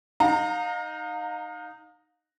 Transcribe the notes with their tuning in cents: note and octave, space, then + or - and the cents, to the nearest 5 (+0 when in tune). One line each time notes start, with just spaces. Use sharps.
D#4 -5 F5 +35 A#5 -25